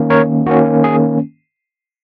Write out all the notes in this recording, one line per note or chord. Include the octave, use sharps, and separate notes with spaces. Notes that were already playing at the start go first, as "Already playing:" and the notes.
Already playing: D#3 A#3 C#4
A#4 C#5
D#3 A#3 C#4 F#4
G#4